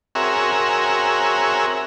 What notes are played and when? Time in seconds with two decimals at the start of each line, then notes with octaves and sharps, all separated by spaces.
0.15 C4 F#4 G#4 A#4 C#5 E5